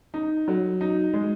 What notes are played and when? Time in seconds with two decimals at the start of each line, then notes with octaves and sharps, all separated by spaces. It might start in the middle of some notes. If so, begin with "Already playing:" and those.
0.14 D#4
0.48 F#3
0.81 D#4
1.13 G#3